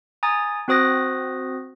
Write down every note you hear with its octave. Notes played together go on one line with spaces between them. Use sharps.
G#5 A#5 D#6 A6
C4 F#4 C5 D#6 F#6 A#6